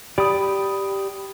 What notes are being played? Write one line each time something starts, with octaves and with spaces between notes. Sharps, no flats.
G4 D5 B5 D#6